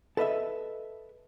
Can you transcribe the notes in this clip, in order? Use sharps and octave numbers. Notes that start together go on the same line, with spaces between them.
A4 B4 D#5 E5